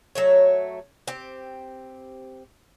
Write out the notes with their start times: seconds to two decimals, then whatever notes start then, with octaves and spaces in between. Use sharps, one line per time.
0.15 F#3 A3 C#5
1.07 C4 G4